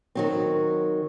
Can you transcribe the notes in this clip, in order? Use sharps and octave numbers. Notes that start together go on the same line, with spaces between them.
D#3 F#3 C4